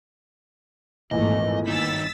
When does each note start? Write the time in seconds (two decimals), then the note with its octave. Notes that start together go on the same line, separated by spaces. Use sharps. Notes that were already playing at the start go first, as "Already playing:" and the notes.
1.11 G#1 E2 A#2 A3 D#5
1.67 G2 D#3 D#4 E6 A6 B6